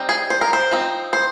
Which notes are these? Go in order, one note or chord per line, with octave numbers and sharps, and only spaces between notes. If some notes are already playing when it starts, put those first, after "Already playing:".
Already playing: G3 C4 D#4
G#4
C5
A#4
C5
F3 C4 D#4
C5